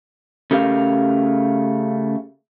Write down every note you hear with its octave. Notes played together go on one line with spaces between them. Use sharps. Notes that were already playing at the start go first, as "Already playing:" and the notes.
C#3 A3 G4 A#4 F5